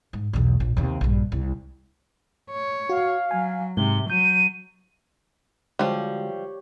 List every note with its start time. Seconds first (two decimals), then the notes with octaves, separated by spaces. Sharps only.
0.13 G#2
0.33 B1 E2
0.60 A#1
0.77 D#2 C3
1.01 A#1 G2
1.32 C2
2.51 C#5
2.89 F#4 F5
3.31 F#3 G#5
3.77 G#2 C3 G7
4.10 F#3 G6 D#7
5.79 D3 F3 G3 G#3 F#4 G4 C#5